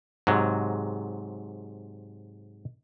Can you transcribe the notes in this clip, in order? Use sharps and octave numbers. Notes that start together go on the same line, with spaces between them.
G#2 C3 F#3